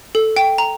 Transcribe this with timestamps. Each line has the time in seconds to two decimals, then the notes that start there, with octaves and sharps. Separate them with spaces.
0.15 A4
0.37 G5
0.58 A#5